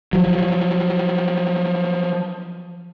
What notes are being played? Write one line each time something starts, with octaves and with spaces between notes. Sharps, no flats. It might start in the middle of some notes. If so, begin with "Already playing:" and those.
F3 F#3